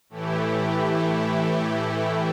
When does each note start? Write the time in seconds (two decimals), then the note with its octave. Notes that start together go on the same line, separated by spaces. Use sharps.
0.09 A2 E3 A3 E4 G4